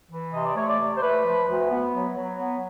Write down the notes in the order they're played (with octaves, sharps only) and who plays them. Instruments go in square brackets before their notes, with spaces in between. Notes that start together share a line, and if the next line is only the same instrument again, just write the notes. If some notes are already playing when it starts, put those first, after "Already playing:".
[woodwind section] E3
C3 D#5
D5
A3 C#5
D5
C3
C5
A3 B4
F3
D2
B3
F#3
F#3
B3